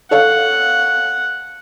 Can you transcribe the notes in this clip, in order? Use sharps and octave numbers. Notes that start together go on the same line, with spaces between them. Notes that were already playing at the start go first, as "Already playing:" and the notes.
A4 C#5 F5 F#5